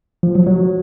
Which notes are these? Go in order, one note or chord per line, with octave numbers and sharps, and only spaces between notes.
F3
F#3
F#3